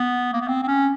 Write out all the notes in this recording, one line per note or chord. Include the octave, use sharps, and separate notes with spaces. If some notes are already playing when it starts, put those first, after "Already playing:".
Already playing: B3
A#3
B3
C4
C4
C#4